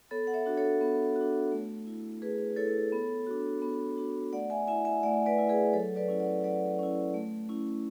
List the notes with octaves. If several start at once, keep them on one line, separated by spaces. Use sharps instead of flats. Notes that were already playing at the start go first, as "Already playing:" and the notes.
B3 A4 C#5
F#5
C#5 E5
D4 F#4
A4 C#5
B3
D4 F#4
A3
E4
A3 G#4 B4
E4 A4 C#5
B3
D4 F#4
B3
D4 F#4
A3 D5 F#5
E5 G#5
E4 E5 G#5
E5 G#5
A3 D5 F#5
B4 D5
E4
G#4 B4
F#3 A4 C#5
B4 D5
C#4 E4
D5 F#5
F#3 D5 F#5
C#4 E4
A3
C#4 E4